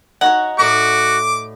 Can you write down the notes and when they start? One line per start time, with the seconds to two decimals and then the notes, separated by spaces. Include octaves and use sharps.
0.21 D#4 F#4 C#5 F#5
0.59 A2 F#4 D5 D6